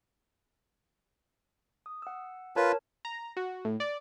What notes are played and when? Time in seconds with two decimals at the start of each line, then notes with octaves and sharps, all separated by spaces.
1.86 D#6
2.02 F#5 E6
2.56 F4 A#4 B4 C#5 A5
3.05 A#5
3.37 F#4
3.65 A2
3.80 D5